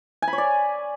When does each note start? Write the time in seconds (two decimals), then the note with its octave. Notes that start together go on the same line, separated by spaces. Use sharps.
0.22 G#5
0.28 B5
0.33 C#5
0.38 D5